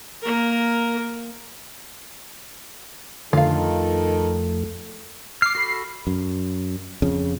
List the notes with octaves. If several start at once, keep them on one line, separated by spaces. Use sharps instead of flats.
A#3 A#4
F2 D3 D#3 A3 F4 A4 F5
D6 F6 C7
F#4 A4 B5
F#2
F2 C#3